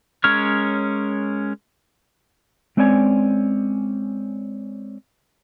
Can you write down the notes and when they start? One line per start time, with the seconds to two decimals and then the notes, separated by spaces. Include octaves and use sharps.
0.24 G#3 C#4 A#4 C#5 F6
2.77 G#3 C4 C#4 D5 G5 G#5